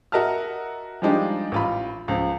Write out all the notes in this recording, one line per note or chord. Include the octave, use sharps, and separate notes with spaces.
F#4 A#4 D#5 E5 A5 F6
F3 G3 G#3 D4 D#4 G4
A1 F4 B5
C#2 F3